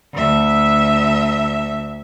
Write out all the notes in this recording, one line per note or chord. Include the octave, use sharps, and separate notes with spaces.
D2 E5